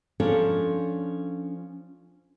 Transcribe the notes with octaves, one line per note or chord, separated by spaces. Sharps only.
F3 C#4 D4 A4 A#4 C#5